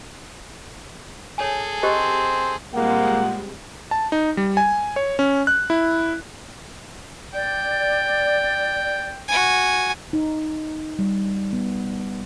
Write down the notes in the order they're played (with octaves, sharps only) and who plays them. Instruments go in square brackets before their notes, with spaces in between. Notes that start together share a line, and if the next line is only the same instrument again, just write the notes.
[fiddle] G#4 A4 [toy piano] C#5 G#5
[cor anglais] C4 [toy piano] G4 C5 D#5
[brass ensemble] A#2 F4 F#5 [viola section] G3 G#3 C4 [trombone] A#3
[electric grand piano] A5
D#4
G3
G#5
C#5
C#4
F#6
E4
[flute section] D5 [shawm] G5
[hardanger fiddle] F#4 G#5
[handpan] D#4
G3
B3